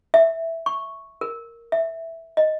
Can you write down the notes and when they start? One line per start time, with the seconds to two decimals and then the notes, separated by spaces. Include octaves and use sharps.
0.14 E5
0.66 C#6
1.21 A#4
1.72 E5
2.37 D#5